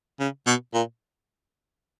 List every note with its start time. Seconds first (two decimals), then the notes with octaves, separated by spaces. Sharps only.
0.20 C#3
0.46 B2
0.74 A#2